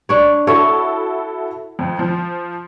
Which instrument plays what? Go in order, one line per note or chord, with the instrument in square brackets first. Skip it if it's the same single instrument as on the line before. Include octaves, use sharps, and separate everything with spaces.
[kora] D4 C#5
[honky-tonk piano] E4 F#4 A4 [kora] C#5
[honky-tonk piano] F2
F3